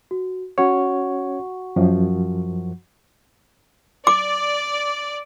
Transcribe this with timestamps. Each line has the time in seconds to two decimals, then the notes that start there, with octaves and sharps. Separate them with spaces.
0.11 F#4
0.58 C#4 F#4 C#5 F#5 C#6
1.76 F#2 F3
4.07 D5 D6